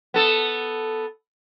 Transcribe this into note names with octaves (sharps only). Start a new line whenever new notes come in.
B3 A4